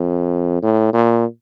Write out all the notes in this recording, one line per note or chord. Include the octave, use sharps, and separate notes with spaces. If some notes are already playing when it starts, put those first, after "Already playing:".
Already playing: F2
A2
A#2